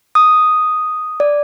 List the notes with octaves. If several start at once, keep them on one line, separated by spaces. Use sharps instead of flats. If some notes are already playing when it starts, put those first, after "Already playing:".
D#6
D5